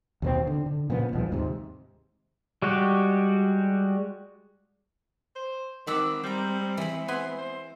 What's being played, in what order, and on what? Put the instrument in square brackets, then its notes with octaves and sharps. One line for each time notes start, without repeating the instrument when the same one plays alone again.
[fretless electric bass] D#2 B2 C4
D3
D3
A#2 C#3 F3 B3
D#1 B1 B2 F3
D#2 G#2 C3
[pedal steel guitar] G3 G#3 F#4 G4
[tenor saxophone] C5
[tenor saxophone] D#3 [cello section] G#3 C4 [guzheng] F#5 A5 B5 [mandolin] D6 E6
[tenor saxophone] G3 [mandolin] C5 A#5
[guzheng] E3 B5
[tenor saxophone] B3 [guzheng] G#5 [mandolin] C6
[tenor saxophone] C5